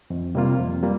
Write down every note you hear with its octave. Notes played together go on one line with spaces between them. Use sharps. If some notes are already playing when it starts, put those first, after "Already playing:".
F2
C3 G3 A#3 F4
F2
G3 A#3 F4